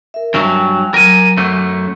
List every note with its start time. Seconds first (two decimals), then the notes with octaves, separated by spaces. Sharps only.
0.14 A#4 E5
0.34 G2 F#3 G5 G#5
0.94 F#3 A#4 G#5
1.37 F#2 A3